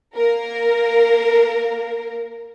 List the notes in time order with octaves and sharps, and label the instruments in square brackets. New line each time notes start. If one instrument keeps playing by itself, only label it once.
[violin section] A#3 A#4